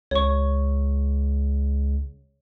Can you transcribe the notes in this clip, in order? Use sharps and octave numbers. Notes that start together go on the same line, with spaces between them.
C#2 C#5 C#6